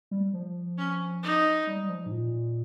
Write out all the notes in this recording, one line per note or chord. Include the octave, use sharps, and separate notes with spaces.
G3
F3
C#4
D#4
G3
G3
F3
G#2
A#2